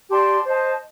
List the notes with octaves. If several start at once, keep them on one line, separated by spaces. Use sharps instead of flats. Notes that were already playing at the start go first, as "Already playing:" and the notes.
G4 D5 A5 C6
C5 D#5 A5